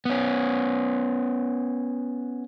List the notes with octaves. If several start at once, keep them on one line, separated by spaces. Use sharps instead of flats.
B3 C#4